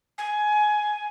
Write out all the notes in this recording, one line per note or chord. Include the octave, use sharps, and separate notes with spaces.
G#5